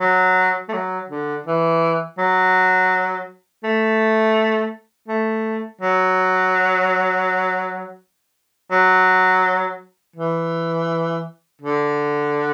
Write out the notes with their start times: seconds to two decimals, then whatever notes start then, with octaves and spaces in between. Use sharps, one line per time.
0.01 F#3
0.69 A3
0.73 F#3
1.09 D3
1.46 E3
2.18 F#3
3.63 A3
5.08 A3
5.81 F#3
8.72 F#3
10.16 E3
11.61 D3